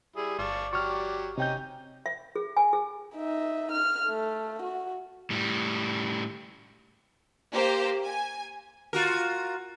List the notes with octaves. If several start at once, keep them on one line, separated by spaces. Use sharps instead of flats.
G3 E4 G#4
G1 D5 F5 A5 C#6
F#3 G4 C#6 F6
C3 C#4 D#4 G5 G6
E5
G#4
G#5
G#4
D#4 E5
F6
A3
F#4
A2 G3
A#3 G4 C5
G#5
F4 F#4 A#4